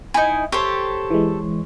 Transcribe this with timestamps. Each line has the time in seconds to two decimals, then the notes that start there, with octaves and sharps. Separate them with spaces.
0.14 D#4 E4 G#5
0.52 G4 A4 C5 C#5
1.11 E3 G#3